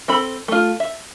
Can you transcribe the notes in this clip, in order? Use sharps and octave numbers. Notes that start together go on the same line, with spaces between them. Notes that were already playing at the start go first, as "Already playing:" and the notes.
C4 A4 B5
A3 F4
E5